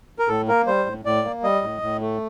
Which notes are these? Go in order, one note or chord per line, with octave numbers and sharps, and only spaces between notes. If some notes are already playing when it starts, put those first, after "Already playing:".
A#4
A2 A4
A#3 A#4
G3 C5
A2
A2 D5
A#3
G3 D#5
A2
A2
A3